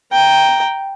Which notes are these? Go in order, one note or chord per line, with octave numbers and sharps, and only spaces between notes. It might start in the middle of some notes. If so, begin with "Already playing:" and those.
G5 A#5